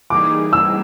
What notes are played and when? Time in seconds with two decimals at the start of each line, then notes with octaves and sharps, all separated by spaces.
0.10 E3 G3 A#3 D#4 G#4 D6
0.53 E6